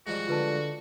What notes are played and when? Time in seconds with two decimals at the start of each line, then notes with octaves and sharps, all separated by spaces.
0.07 G#2 F3 G3 F#4
0.28 D3 F4 B4 A5